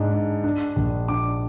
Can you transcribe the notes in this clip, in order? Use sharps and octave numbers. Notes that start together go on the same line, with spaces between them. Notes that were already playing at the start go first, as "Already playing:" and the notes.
Already playing: G#2 D4
D4
D4
A#1
D4 D6